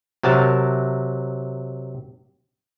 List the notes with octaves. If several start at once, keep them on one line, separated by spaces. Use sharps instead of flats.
C3 F#3 A#4 A5